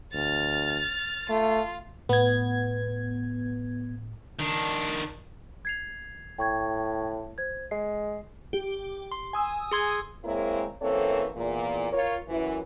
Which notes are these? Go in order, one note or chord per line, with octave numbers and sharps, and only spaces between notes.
D2 F6 A6
A3 F4
A2 B3 G#6
D#3 D4
G#6 C7 F7
A2 G5 C#6 G#6
C5 G#6
G#3 C7
G4
C6
G#5 D#6 E6
G#4 C6 G#6
G#3 A#3 C4 E4 A#4 C#5
F#2 E3 A#3 C4 A4 C#5
E2 A#2
F4 A#4 C#5
F#2 E3